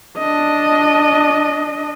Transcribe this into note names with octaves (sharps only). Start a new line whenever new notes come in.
D4 D#5